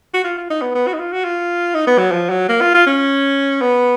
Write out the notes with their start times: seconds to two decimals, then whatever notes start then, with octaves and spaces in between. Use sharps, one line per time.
0.14 F#4
0.24 F4
0.38 F4
0.50 D#4
0.62 B3
0.75 B3
0.87 F#4
0.94 D#4
0.99 F4
1.12 F#4
1.24 F4
1.74 D#4
1.87 B3
1.99 F#3
2.12 F3
2.30 F#3
2.49 A#3
2.61 F4
2.74 F4
2.87 C#4
3.61 B3